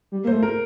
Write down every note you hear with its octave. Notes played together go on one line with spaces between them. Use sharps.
G3
A#3 C5
A3
A#4